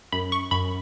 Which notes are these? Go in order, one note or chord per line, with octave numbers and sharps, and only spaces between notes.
F#2 B5
C#6
F#2 B5